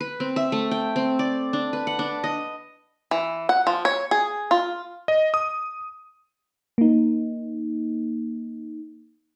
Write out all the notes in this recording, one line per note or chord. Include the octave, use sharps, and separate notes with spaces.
B4
C4
E5
A3
G5
C4
D5
D4
B4
F#5
D4
D#5
E3
F#5
F3
C#5
G#4
F4
D#5
D#6
A#3 D#4